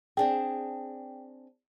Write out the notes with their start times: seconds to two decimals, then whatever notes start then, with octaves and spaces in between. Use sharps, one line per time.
0.17 C4 D4 G#4 G5